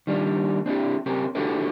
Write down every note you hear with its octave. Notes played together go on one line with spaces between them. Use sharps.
D#3 G3 D4
C4 D4 E4 G4
C4 C#4 G4 A#4
D4 E4 F#4 G4 A4 B4